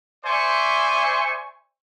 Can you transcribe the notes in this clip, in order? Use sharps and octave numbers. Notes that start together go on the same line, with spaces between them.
C5 D5 E5 G#5 C#6